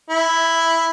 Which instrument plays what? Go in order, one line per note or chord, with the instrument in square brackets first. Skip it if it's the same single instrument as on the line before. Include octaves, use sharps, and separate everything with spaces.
[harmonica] E4